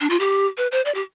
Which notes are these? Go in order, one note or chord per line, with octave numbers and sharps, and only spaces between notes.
D4
F4
G4
B4
C5
D5
G4